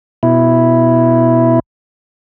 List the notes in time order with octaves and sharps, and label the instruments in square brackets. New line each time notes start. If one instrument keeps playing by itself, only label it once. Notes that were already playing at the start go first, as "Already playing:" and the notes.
[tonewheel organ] B2 E4